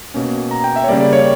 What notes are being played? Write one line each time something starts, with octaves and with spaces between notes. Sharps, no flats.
B2 A#3 C#4
A#5
G5
E5
C#5
C#3 G3 A#3 D5
D5
C#5